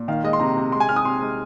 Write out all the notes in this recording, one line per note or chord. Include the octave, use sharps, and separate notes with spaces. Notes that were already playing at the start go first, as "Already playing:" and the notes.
Already playing: A#2
D#3 F5
G#3 D#5
C6
C3 A#5
C3
G#3 C6
G#5
C3 F6
D#6
C3 C6
G#3